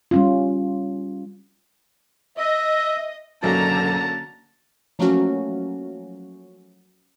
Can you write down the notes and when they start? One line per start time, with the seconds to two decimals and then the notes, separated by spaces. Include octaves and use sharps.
0.11 G3 C#4 F4
2.38 D#5 E5
3.43 F#1 B1 D3 F#3 A#3 C#4 A5 A#5
4.99 F3 F#3 A3 A#3 C#4 F#4